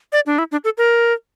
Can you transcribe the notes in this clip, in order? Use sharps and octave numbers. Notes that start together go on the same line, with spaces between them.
D5
D4
E4
D4
A4
A#4